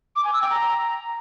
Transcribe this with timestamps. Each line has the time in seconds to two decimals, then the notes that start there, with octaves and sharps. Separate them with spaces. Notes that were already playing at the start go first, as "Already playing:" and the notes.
0.16 D6
0.25 G#5
0.33 E6
0.42 G5
0.50 A#5